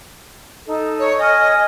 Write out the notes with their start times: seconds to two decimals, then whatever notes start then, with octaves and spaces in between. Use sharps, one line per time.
0.66 D#4 A4
0.99 C#5
1.18 D#5 G#5 F6